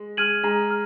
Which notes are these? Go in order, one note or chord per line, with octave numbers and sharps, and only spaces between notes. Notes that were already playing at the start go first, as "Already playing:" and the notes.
Already playing: G#3
G#3 F6 G#6 D#7 F#7
G#3 A#5
F6